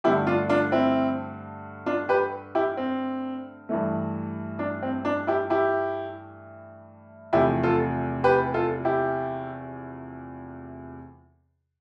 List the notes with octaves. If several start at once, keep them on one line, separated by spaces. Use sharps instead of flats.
G2 D3 A3 E4 G4
D4 F4
D4 F4
C4 E4
D4 F4
G4 B4
E4 G4
C4
G2 E3 A3
D4
C4
D4
E4 G4
E4 G4
E2 C3 F3 A3 E4 G4
F4 A4
G4 B4
F4 A4
E4 G4